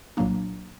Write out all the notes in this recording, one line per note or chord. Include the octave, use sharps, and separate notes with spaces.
C2 A#2 F#3 A#3 D4